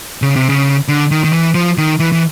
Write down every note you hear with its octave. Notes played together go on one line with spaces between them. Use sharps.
C#3
C3
C#3
D3
D#3
D#3
E3
F3
D#3
E3
E3